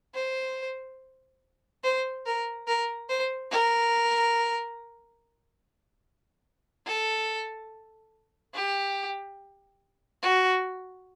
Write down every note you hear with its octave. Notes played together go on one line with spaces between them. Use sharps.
C5
C5
A#4
A#4
C5
A#4
A4
G4
F#4